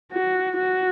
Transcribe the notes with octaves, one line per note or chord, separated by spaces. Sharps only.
F#4
F#4